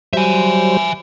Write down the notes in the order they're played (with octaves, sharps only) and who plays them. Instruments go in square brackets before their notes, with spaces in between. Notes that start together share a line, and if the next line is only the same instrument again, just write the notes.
[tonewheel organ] F#3 G3 C5 [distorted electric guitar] E5 G#5